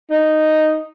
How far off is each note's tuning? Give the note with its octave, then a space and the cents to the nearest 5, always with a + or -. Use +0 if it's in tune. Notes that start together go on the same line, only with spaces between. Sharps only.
D#4 -5